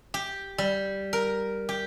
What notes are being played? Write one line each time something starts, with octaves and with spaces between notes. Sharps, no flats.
G4
G3
A#4
G4